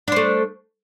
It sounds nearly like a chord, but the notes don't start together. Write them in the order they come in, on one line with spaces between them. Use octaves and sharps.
D4 C5 A3